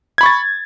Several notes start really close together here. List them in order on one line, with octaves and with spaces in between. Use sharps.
G#6 B5 C#6 A6